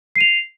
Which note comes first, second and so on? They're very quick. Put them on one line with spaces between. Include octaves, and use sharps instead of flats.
C7 D#7 F7